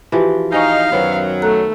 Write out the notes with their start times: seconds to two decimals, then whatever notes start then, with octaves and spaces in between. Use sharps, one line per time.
0.12 E3 F3 F#4 G4 B4
0.53 D#4 C5 F5 G5 G#5 A#5 C#6
0.92 F#2 D#3 F#3 B3 B4 C5
1.42 A3 A4 A#5 F#6